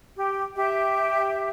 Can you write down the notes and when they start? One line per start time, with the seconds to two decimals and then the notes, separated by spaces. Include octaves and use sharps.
0.16 G4
0.55 G4 E5